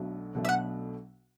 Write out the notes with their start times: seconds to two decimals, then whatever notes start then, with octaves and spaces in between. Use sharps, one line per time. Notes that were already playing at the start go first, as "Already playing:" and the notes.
Already playing: B1 B2 F#3 A3 D4
0.35 B1 B2 F#3 A3 D4
0.45 E5
0.49 F#5